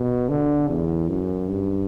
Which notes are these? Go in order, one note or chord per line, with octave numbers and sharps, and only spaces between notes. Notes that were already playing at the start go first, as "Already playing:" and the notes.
Already playing: B2
D3
E2
F#2
G2